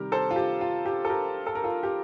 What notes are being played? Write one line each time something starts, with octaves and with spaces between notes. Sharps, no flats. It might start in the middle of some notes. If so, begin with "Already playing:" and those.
Already playing: C3 D#3 G3 G4 A#4
A4 C5
F4
G4
F4
G4
A4
G4 A#4
A4
A#4
F4 A4
G4